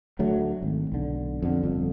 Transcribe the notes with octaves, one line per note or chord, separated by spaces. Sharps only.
D2 F#3 A3
G#1
B1 D3
F2 D3
G1 F2